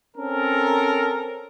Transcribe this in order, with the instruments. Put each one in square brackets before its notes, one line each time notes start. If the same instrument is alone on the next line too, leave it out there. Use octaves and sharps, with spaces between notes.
[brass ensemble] C4 C#4 A4 A#4